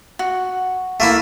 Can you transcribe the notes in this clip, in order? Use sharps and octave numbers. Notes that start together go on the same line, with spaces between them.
F#4
A3 A#3 E4